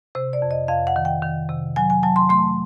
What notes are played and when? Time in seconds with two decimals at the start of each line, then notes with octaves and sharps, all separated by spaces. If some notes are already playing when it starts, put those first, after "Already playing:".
0.15 C3 C5
0.33 D5
0.42 F2
0.51 D#5
0.68 F2 F5
0.87 F#5
0.96 D#3
1.05 G5
1.23 D#3
1.49 C3
1.76 F#3 G#5
1.90 G#5
2.03 F#3 A5
2.16 C6
2.29 A3 C6